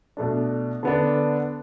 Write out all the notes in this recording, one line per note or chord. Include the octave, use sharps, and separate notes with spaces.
B2 A3 D4
D3 B3 D4